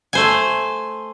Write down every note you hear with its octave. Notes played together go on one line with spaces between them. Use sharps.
A3 C5 G#5